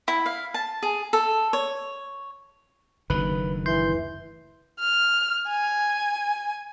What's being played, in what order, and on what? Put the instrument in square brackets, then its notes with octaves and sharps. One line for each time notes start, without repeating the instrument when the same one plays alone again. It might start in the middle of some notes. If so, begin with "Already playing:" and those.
[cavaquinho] E4
F5
A5
G#4
A4
C#5
[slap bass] F#1 D2 D#3 [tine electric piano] B4
[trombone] E3 [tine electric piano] C6 G6
[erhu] F6
G#5